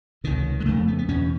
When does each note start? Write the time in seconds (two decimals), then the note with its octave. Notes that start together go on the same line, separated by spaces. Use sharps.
0.24 C#2 C3 D#3
0.60 G#3
0.65 C#3 A3
0.68 F2
0.77 A3
0.88 B3
0.99 B3
1.08 E2 B2 C#4